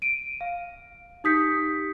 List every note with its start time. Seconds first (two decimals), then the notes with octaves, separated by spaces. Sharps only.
0.02 D7 D#7
0.41 F5
1.24 D#4 G4 D#6 G6 B6 C#7